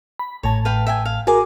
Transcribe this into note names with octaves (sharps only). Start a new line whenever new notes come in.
B5
A1 A2 C#5 A5
B4 F5 G5
E5 G5 G#5
F5
F#4 G#4 A#4 G#5 D6